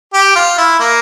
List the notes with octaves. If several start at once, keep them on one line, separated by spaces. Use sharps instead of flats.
G4
F4
E4
A#3